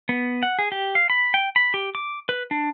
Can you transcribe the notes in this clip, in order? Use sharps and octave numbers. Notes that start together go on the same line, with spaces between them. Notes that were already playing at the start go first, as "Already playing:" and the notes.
B3
F#5
G#4
G4
F5
B5
G5
B5
G4
D6
B4
D4